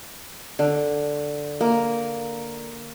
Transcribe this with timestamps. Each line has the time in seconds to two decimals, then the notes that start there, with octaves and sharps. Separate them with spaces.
0.59 D3
1.60 A#3